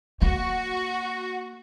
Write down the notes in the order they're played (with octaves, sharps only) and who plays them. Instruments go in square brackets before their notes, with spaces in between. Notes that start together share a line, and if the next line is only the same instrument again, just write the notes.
[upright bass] A#3 [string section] F#4